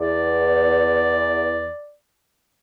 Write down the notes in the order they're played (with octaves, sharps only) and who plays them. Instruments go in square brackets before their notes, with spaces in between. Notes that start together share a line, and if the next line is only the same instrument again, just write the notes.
[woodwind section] E2 [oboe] D5